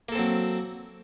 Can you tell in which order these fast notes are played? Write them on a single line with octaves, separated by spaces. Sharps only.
A#3 A4 C4 F#3